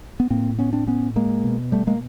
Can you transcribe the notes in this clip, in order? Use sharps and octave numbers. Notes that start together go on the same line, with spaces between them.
B3
A2 A#3 C4
B3 C#4
C4 D4
B3 C#4
G#3 A#3
B2
G3 A3
G#3 A#3